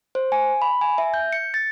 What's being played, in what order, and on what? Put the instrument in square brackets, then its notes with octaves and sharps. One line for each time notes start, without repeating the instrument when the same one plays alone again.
[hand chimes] C5
G#5
B5
G#5
E5
G6
C#7
A6